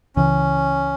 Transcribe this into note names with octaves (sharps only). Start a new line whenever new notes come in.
C#2 C#3 E3 C#4